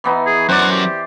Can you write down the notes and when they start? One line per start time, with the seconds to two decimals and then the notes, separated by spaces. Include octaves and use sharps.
0.04 E3 B3 D#4
0.26 G#4
0.49 F#2 F#4 C5 D5 F#5
0.71 G4